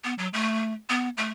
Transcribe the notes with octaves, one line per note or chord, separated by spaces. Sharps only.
B3
F#3
A3
B3
A3